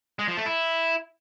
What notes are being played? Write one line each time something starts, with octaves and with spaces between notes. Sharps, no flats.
G#3
F3
A3
E4